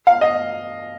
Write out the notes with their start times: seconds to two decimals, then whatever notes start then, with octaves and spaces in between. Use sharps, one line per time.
0.07 F5
0.21 D#5